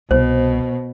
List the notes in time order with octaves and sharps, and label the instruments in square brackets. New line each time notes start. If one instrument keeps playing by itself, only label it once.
[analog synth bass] C2 [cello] B2 [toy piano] C5